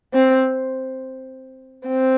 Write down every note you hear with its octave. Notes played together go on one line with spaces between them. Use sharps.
C4
C4